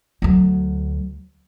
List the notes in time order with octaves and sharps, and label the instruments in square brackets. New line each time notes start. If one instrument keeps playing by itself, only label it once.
[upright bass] D2 F#3